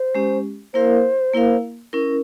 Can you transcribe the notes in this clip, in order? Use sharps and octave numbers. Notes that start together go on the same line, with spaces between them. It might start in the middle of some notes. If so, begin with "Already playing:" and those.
Already playing: C5
G#3 C#4 G4
A#3 E4 A#4 C5 F5
A#3 E4 A#4 F5
C#4 E4 A#4